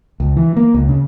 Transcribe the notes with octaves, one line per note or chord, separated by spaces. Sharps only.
C#2
E3
A#3
C#2
C#3